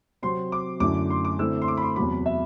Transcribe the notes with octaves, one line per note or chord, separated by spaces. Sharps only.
C3 F#3 C4 C6
D6
F#2 D3 A3 E4 D6
C6
D6
D3 A3 C4 E4 E6
C6
D6
B5
C6
E2 C3 F#3 B5
E5